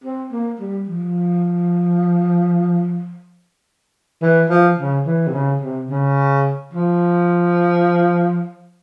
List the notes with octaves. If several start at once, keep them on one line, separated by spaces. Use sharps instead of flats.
C4
A#3
G3
F3
E3
F3
C#3
E3
C3
C#3
C3
C#3
F3